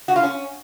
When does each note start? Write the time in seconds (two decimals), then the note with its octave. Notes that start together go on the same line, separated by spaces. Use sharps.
0.08 F#4
0.16 F4
0.23 C#4